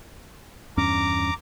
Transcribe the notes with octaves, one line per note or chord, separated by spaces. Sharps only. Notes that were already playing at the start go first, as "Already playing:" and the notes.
E2 G2 C#4 A#5 D6